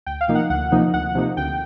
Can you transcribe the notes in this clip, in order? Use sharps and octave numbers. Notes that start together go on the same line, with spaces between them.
D2 G5
F5
C3 F3 A#3 D#4
F#5
D2 F#5
C3 F3 A#3 D#4
D2 F#5
C3 F3 A#3 D#4
D2 G5